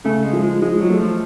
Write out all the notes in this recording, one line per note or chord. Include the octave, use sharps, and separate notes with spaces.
C#3 A3
G#3
F3
G#3
F3 G#3
F#3
A3
F3